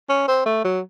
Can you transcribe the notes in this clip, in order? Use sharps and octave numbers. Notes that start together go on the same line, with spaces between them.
C#4
C4
A3
F#3